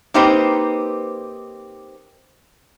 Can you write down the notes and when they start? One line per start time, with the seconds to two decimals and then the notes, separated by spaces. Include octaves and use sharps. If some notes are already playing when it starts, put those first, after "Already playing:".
0.14 A#3 C4 D#4 G4 B4 C5